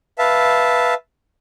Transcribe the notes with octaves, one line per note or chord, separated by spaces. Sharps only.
B4 E5 F5 A5